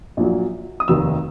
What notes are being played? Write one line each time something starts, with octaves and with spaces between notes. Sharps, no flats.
A#1 A#2 F#3
D#6
F1 D#2 D#3 E6